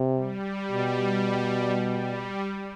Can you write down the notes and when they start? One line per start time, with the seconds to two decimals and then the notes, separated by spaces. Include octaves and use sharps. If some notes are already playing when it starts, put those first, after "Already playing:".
Already playing: C3
0.13 G3
0.72 B2
1.88 G3